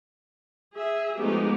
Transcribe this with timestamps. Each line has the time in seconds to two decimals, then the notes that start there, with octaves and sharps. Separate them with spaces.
0.74 G#4 E5
1.18 F3 G#3 A3 B3 D#4 G4